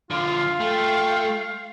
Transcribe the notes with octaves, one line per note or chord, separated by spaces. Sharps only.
D3 F3 F4 F5
A3 G5